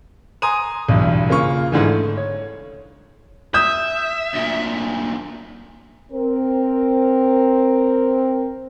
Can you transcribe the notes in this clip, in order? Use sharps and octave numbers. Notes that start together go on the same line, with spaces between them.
G#5 A#5 C6 D#6 D#7
B1 E2 G2
C#3 A#3 F4 C#6
G#2 D3 E3
A3
C#5
E5 D#6 G6
D2 A#2
C4 A#4